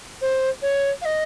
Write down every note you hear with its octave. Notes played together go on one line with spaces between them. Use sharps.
C5
C#5
F5
D#5